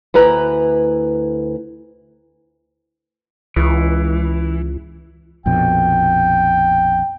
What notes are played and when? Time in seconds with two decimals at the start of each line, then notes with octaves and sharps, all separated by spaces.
0.14 D2 E4 B4 A#5
3.56 C#2 E3
5.46 A#1 F2 B2 G5